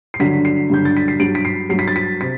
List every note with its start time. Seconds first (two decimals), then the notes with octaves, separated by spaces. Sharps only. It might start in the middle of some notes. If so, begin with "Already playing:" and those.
0.14 C7
0.20 G2 D3 F#3 B6
0.45 C7
0.70 G2 D3 F#3 G6
0.85 A6
0.97 B6
1.08 C7
1.19 G2 F#3 D7
1.35 B6
1.45 C7
1.69 F#3 C7
1.74 G2
1.79 B6
1.87 A6
1.96 B6
2.21 C3 B6